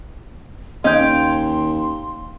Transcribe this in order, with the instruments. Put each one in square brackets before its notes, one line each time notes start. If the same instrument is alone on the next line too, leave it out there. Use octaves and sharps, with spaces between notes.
[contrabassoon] D#2 [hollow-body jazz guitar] C#4 D#5 [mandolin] F5 G5 [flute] C6